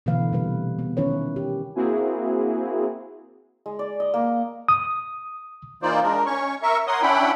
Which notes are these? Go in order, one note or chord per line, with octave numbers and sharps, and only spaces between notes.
B2 D3 E3 A3 B4 F5
C3 G3 B4
B3
D#3 C#4 E4 B4 C#5
G4
A#3 C4 E4 F#4 G#4
G#3
D5
D#5
A#3
D#6
E3 A#3 D#4 F4 C5 D5
G#3 D4 A#4
C#4 C#5 C#6
A#4 E5 C#6
A#4 C#5 F#5 C6 D#6
C#4 D4 E4 F#5 G5 B5